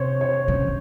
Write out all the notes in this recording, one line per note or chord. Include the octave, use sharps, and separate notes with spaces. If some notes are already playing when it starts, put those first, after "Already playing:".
Already playing: C3 C5 C#5
C#5
C#3